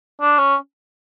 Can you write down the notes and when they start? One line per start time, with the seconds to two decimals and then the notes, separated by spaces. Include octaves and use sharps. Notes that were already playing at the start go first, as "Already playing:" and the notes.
0.21 D4
0.39 C#4